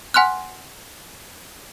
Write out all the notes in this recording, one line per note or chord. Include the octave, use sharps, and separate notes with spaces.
F#5 G#5 C6 F6 F#6